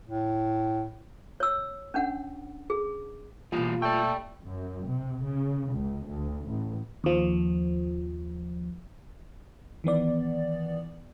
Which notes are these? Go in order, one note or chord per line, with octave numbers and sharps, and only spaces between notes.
A2
C#5 E6
C#4 D4 F#5
G#4
B2 E3 G3 A#3 F4 F5
A3 D5 G5
F#2
C3
C#3
C#2
D2
A1
D#2 F3
D#3 E3 B3 D5